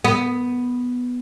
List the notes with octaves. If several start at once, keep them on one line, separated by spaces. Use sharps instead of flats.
B3